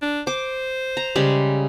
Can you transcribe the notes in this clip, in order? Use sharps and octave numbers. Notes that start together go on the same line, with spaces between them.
D4
C5 D6
A#5
C#3 G3 G#3